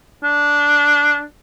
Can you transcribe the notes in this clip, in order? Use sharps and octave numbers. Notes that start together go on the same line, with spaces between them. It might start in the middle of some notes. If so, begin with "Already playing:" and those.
D4